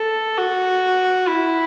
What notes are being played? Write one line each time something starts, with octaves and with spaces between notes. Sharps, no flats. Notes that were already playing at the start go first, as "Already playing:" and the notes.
Already playing: A4
F#4
E4